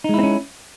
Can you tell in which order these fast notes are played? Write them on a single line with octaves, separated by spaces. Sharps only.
D#4 G#3 E4 C4 C#4